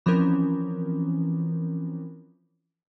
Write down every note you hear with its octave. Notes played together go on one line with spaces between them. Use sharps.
E3 F3 C4 C#4 A#4